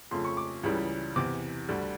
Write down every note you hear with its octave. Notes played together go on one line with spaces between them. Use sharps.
F2 C#3 F3 A3 C6
C#6
D6
C#2 C#3 E3 G3
E2 C3 E3 D6
D2 D3 G3